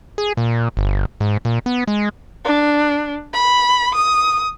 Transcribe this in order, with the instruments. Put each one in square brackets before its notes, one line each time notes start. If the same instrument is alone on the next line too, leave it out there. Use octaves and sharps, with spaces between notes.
[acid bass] G#4
A#2
G1
G#2
A#2
B3
G#3
[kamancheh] D4
B5
D#6